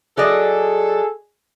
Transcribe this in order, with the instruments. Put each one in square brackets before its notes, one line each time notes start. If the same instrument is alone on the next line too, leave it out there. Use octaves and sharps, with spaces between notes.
[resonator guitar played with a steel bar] F#3 D5 D#5 [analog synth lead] G#4 [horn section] A4